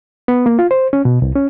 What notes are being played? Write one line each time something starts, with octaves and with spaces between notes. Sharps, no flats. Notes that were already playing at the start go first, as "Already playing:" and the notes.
B3
A#3
F4
C5
C#4
B2
C2
C#4